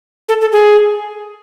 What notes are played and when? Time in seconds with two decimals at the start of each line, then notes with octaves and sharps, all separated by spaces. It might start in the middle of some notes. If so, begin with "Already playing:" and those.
0.29 A4
0.41 A4
0.52 G#4